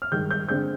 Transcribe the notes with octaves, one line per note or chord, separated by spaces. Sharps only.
F6
G2 D#3 G#3 G6
G6
D3 G#3 C4 G6